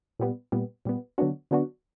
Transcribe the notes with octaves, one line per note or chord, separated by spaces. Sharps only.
A#2 G3 B3
A#2 G3 B3
A#2 G3 B3
D3 F#3 B3 D4 F#4
D3 F#3 B3 D4 F#4